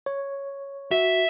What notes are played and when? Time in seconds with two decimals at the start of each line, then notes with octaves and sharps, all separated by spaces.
0.06 C#5
0.91 F#4 E5